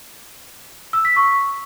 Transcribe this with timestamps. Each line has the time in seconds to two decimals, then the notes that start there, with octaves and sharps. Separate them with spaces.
0.93 E6
1.05 B6
1.16 C#6